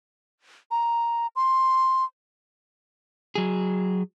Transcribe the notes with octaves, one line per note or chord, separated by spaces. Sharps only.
A#5
C6
F#3 G#4